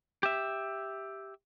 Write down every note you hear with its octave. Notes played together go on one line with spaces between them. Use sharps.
G4 E5